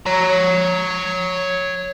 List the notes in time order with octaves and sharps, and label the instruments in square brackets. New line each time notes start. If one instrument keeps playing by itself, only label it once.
[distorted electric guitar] C#5 A#5